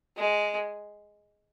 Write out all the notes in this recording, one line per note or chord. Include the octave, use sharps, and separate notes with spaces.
G#3